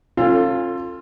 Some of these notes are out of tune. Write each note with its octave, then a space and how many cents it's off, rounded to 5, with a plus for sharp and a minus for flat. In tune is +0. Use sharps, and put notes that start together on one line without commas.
C#4 -40 F4 +0 A4 +25